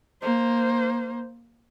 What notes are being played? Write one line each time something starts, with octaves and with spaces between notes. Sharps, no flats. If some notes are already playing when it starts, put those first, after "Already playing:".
A#3 C5